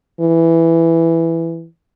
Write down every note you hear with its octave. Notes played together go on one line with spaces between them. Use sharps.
E3